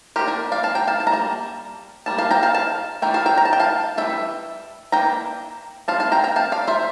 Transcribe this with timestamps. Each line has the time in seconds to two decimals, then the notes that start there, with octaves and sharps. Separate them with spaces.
0.16 F3 A#3 D4 G4 A#4
0.27 A#4 D5
0.52 D5 F5
0.64 F5 A5
0.75 G5 A#5
0.87 F5 A5
1.00 A5
1.07 A#5
1.12 G3 A#3 A5
2.06 G3 A#3 A5
2.18 F5 A5
2.31 G5 A#5
2.43 F5 A5
2.54 F5 A5
3.02 E3 A3 D4 G5 A#5
3.14 F5 A5
3.26 G5 A#5
3.38 A#5
3.45 A5
3.53 G5
3.60 F5 A5
3.97 E3 G3 D4 E5 G5
4.92 E3 A#3 D4 G5 A#5
5.88 G3 C4 F5 A5
6.00 F5 A5
6.12 G5 A#5
6.24 G5 A#5
6.36 F5 A5
6.52 D5 F5
6.68 C5 E5